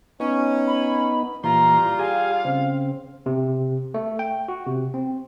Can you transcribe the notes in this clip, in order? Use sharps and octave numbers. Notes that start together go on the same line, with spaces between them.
B3 C#4 D#4
B5
A#2 E3 G3 F4 A#5 C6
G4 G#4 F5 G#5
C#3 C4
C3
A3
G5
F#4
C3
C4